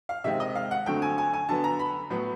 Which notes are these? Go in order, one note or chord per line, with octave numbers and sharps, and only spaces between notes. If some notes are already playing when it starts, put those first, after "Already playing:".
F5
C3 D#3 G#3 C4 E5
D#5
F5
F#5
D3 F#3 A3 C4 G5
G#5
G#5
G#5
D3 F#3 B3 A5
A#5
B5
A2 F#3 B3